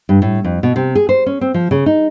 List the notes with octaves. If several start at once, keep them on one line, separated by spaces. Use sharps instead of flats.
G2
A2
F2
B2
C3
G#4
C5
C#4
C4
F3
C#3
D#4